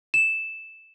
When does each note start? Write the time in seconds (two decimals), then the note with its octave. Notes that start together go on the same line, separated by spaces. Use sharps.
0.14 E7